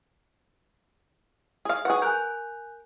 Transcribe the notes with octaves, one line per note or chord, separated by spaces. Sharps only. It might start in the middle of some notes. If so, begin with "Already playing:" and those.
G#4 F5
G#4 B4 F#5 C#6
A#4 G#5 F#6 G6